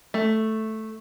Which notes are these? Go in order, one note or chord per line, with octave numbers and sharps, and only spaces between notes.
A3